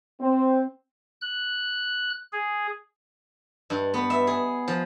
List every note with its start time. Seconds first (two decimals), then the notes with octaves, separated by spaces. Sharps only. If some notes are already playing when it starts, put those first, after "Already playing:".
0.20 C4
1.21 F#6
2.32 G#4
3.70 G2
3.94 B3
4.10 E5
4.27 G#4
4.68 F3